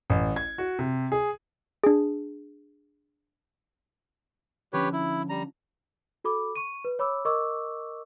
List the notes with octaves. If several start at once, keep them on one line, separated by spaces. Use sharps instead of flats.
A1
G#6
F#4
C3
G#4
D4 G#4
D3 F3 C#4 G4 B4 C#5
E4
G3 A#5
F#4 A4 B5 D6
C#6 D#7
B4
C#5 B5 D6 E6
A#4 D#5 C#6 D6 E6